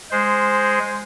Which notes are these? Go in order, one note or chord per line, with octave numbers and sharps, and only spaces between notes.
G#3 C5